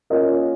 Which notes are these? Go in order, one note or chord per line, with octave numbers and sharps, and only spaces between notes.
A#3 C#4 F4 A#4 D#5